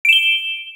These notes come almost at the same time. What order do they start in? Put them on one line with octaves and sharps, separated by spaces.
D7 E7 G7